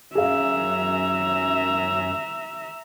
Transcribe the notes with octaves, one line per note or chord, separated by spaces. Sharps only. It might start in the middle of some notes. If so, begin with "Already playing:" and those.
F#2 G#4 E5 F5 A#5